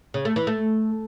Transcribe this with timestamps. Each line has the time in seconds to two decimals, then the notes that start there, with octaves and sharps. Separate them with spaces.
0.14 C#3
0.25 A3
0.36 E3
0.47 A3